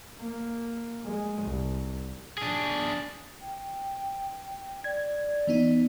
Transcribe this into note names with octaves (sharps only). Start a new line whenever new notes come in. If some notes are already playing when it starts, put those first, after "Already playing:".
A#3
G#3
C2
D4 G#4
G5
D5 G#6
E3 B3 D#4